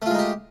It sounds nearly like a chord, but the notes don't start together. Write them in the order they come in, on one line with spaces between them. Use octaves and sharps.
A3 F4 G#3 D#4 G4